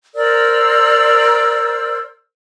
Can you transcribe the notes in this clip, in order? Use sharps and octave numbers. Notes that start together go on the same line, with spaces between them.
A#4 C5 D5 E6